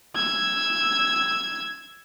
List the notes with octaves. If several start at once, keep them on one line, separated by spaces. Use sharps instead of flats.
E6 G#6